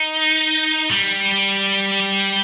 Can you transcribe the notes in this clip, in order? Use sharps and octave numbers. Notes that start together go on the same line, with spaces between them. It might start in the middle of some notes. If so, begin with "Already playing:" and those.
Already playing: D#4
G3